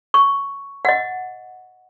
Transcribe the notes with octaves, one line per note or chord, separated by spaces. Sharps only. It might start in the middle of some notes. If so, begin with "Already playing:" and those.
C#6
D#5 F#5